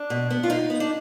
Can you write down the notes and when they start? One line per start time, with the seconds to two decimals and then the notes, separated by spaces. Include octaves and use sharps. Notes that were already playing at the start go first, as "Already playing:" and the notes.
Already playing: D4
0.10 B2
0.31 B3
0.43 F4
0.50 B2 D#4
0.70 B3
0.80 D4